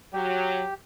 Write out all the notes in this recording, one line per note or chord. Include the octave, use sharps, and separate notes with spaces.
F#3 G4